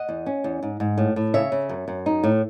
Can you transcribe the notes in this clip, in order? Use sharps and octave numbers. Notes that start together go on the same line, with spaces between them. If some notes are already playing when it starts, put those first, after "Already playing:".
Already playing: D#5 F#5
E2
C#4
E2
G#2
G#2
A2
A2
C#3 C#5 E5
C#3
F#2
F#2
D#4
A2